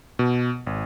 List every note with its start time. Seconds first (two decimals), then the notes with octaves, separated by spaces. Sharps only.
0.19 B2
0.67 G#1